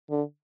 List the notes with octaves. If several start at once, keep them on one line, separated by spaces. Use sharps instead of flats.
D3